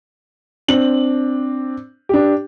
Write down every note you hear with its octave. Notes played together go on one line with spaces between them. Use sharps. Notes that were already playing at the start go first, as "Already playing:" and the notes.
C4 D4 F#7
D4 G4